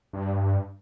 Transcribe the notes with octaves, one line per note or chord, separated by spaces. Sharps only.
G2